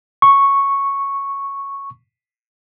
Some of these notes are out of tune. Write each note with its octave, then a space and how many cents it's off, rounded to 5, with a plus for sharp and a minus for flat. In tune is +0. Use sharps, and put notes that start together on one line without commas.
C#6 -5